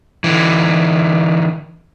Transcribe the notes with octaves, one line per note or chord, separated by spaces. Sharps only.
D3 E3